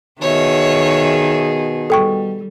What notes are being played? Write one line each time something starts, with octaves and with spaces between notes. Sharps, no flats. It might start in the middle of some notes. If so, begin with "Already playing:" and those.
B2 D#3 G#4 C#5 E5
G3 A4 G5 C#6